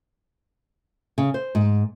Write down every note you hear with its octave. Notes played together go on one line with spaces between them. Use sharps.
C#3
C5
G#2